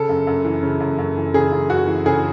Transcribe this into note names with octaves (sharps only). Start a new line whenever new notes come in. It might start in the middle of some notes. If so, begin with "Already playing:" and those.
Already playing: C#3 A4
F#2
F#2
E3
C#3
F#2
F#2
E3
C#3 G#4
F#2
F#2 F#4
E3
C#3 G#4